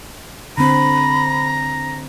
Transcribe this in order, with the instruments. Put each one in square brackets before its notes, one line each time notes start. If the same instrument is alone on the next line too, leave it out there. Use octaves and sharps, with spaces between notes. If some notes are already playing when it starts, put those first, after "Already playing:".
[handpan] D3 C4 [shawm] A#5 [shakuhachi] B5